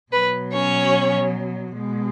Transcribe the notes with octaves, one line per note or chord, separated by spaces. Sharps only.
B2 F#3 B4
C#4 C#5
B2 G#3